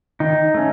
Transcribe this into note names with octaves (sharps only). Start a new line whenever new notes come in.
D#3 D#4
A3 C#4